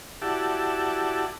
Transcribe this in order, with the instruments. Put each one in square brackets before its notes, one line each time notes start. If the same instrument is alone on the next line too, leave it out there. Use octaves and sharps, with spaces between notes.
[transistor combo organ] E4 F#4 G4 D5 A5